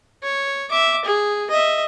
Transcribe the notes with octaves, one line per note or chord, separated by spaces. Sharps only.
C#5
E5 D6
G#4
D#5 E5